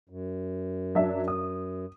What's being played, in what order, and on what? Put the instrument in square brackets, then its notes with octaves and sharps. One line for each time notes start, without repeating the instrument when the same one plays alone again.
[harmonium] F#2
[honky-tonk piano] F#3 D4 E5
D#6